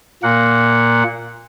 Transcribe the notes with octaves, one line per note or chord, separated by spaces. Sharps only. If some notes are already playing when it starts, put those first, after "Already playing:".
A#2 A#3 F#5